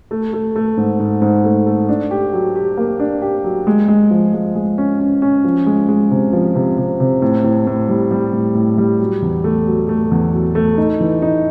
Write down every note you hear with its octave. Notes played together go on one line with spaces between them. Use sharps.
A3
A3
A3
G#2
G#2
G#2
A3
A3
D4
G4
F#3
G4
A#3
D4
G4
F#3
G#3
G#3
F3
G#3
G#3
C#4
C#4
C#4
F3
G#3
G#3
C3
F3
C3
C3
C3
A2
A2
A2
G3
G3
A2
A2
G3
F#3
E2
A3
F#3
A3
E2
F#3
A3
D#4
E3
D#4